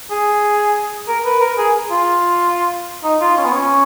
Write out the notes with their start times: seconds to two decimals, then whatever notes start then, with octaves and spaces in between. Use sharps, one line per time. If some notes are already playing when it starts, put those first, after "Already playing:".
0.11 G#4
1.08 A#4
1.25 B4
1.41 A#4
1.58 G#4
1.91 F4
3.04 D#4
3.21 F4
3.37 C#4
3.45 B3
3.52 C#4